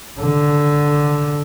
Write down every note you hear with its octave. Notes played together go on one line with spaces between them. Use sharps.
D3